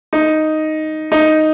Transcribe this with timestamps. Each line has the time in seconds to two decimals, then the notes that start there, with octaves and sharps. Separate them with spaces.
0.13 D#4
1.12 D#4